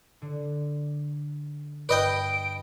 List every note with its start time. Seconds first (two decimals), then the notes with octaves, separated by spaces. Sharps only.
0.22 D3
1.89 G2 B4 D#5 G5 D7